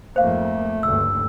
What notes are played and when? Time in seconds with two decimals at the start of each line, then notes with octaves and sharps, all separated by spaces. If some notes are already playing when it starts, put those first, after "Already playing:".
0.16 F2 G#2 A3 A#3 C5 F5
0.83 F#1 D2 G2 E6